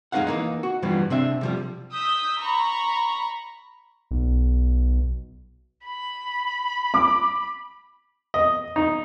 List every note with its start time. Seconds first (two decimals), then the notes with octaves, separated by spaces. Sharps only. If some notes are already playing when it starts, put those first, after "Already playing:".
0.12 F2 G#3 D#4 A#4 F5 F#5
0.27 E3 A#3 D#4
0.63 F#4
0.82 G2 E3 F3 G3 B3
1.10 C3 C4 D4 E5
1.41 C3 F3 G3
1.91 D#6 E6 G6 B6
2.40 A#5 B5 C#6
4.11 B1
5.85 B5
6.94 D6
8.34 D#5
8.76 D#4